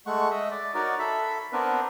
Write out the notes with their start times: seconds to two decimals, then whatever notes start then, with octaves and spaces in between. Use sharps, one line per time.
0.06 G#3 A3 F#5 C#6
0.31 D#5 E5
0.51 D5
0.75 D#4 F#4 A#4 C#5 D5
0.99 A4 E5 B5
1.53 B3 C4 D4 A#4 B4